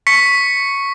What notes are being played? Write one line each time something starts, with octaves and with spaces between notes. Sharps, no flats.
C#6 B6 C#7